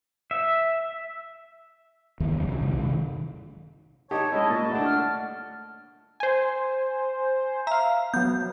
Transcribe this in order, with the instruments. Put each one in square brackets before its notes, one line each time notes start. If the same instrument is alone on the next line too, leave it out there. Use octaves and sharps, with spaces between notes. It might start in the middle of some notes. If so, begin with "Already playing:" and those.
[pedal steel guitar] E5
[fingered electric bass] G1 E2 D#3
F#1 F#2
C2 C#3
A#1 F#2 D#3 G#3
C3 D#3
[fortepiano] D#4 G4 [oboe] C#5 [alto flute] A5
[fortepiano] G#3 C#4 [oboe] E4 [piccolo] D#5
[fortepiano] A#2 [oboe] A5 [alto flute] C#6
[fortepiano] A3 D4 [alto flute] F#5
[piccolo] F6
[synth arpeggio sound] C5 G#5
[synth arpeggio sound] E5 F5 [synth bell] A#5
[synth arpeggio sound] F#3 B3 [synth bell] G6